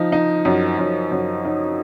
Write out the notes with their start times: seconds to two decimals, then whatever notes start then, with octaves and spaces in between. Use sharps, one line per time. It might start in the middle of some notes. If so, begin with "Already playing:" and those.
Already playing: F3 D#4
0.12 D#4
0.45 F#2
0.78 F#2
1.11 F#2
1.45 D#4